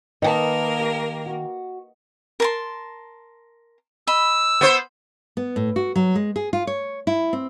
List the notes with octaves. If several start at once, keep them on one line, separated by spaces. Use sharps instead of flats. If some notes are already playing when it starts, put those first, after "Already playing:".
D#3 A#3 A#4 B4 D#5 F#5 A5
G4
F#4
A#4 A5 C6
D#5 B5 E6
B3 C5
B3
A2
F#4
F#3
G#3
G#4
F4
C#5
E4
C4